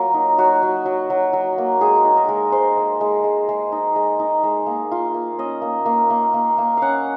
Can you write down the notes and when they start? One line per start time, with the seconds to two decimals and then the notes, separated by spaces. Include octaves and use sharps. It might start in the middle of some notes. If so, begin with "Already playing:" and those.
Already playing: F#3 A#3 F4
0.14 D#4
0.38 F#3 F#4
0.63 F#3
0.86 F#3
1.10 F#3
1.33 F#3
1.58 A#3
1.81 G#3 G#4
2.05 D#4
2.17 A#4
2.28 G#3
2.52 G#3 C5
2.77 G#3
3.01 G#3
3.24 G#3
3.49 G#3
3.72 D#4
3.96 G#3
4.19 D#4
4.43 G#3
4.67 A#3
4.92 F4
5.14 A#3
5.38 C#4 D#5
5.62 A#3
5.86 A#3
6.10 A#3
6.34 A#3
6.58 A#3
6.77 C#4 F5 F#5